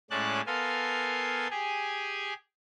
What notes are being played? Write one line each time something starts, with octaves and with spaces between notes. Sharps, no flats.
A2 G#3 C#4 D5 A5 F#6
B3 A4 A#4 F5 G#5 C6
G4 G#4 G#5